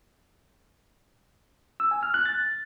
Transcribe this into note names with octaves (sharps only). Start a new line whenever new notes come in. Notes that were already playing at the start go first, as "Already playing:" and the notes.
E6
G#5
F6
F#6
A6